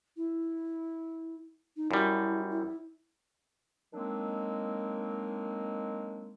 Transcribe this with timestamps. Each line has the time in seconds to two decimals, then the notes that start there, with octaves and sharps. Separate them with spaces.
0.16 E4
1.76 D#4
1.91 F#2 G3 E4
2.50 E4
3.93 D#3 F#3 G#3 A#3 C4 D4